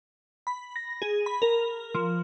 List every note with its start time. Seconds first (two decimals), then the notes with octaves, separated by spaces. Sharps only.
0.47 B5
0.76 A#6
1.02 G#4
1.26 B5
1.42 A#4
1.95 F3